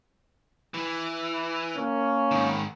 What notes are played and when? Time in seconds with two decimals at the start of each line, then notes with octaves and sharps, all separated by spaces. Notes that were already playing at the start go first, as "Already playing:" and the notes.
0.74 E3
1.75 A#3 C#4
2.31 G#2 D#3